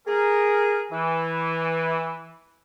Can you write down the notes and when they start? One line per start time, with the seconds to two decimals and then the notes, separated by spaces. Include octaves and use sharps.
0.07 G#4 A#4
0.91 E3